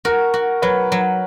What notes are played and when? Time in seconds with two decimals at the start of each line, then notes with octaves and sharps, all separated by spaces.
0.05 F#4 A#4
0.34 F#4
0.62 F#3 B4
0.92 F#3